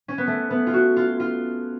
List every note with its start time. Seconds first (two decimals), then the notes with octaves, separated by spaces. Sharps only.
0.08 C#4
0.18 B3
0.27 A3
0.50 B3
0.67 F4
0.73 F#4
0.96 F4
1.20 F4